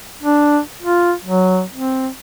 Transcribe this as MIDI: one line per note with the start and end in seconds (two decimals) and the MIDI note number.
0.23 0.59 62
0.82 1.13 65
1.24 1.63 54
1.74 2.08 60